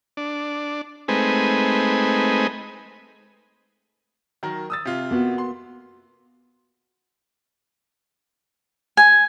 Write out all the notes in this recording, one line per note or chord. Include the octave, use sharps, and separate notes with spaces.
D4
G#3 A3 C4 D#4 B4 G#5
D#3 F#3 A#4
D#6 E6 A6
C3 F4
A#3 B3 F#4
C6
G#5